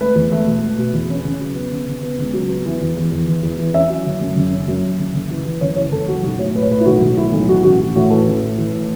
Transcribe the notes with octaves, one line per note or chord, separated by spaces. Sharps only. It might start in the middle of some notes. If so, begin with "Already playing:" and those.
A3 B4
E2
A3
B2
A3
B2
E2
C#4
C#3
F#3
B3
C#3
C#3
B3
C#2
F#3
B3
E3
E2
E2
E2
E3
E2
E3
C#4 E5
F#3
F#1
F#2
F#1
C#4
F#2
F#2
F#1
F#1
E3
E3
F#1 C#5
E3 C#5
F#1 A4
F#2 F#4
B1 F#4
A2 C#5
A3 B4
C#5
A2 B4
E4
B1 F#4
B1
A2 E4
B1
E3 F#4
A1 F#4
A1 F#4
A2 F#4
E3 A4
A1
A2
E3
A2